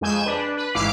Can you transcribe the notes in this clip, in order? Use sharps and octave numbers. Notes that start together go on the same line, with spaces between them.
F2 G#3 G#5 G6 E7
D4 B4
B4
A1 G#2 E4 F5 D6 C7